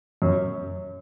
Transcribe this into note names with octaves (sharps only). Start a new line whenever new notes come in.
F#2